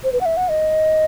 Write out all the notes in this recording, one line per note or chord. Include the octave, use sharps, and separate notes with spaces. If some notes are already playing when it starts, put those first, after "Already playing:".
C5
B4
F#5
E5
F#5
D#5